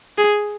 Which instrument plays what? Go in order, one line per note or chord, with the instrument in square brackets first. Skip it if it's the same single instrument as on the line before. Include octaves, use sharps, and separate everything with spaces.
[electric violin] G#4